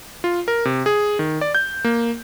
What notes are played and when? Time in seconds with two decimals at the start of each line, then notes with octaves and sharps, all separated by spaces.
0.24 F4
0.48 A#4
0.65 C3
0.86 G#4
1.19 D#3
1.41 D5
1.55 G6
1.84 A#3